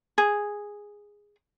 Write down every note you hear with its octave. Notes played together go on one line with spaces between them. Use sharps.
G#4